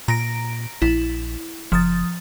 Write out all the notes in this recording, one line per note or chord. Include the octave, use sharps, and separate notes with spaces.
A#2 A#5 A#6 D7
A#1 E4
F#1 F3 D#6 A6